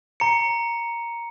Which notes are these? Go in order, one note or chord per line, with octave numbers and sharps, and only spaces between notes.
A#5 C#7